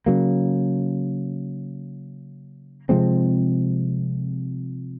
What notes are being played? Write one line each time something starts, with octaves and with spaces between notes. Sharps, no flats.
C#3 F#3 A#3
C3 F3 G#3 C4